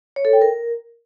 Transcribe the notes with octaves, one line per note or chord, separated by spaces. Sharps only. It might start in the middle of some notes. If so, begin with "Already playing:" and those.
C#5
A4
G5
A#4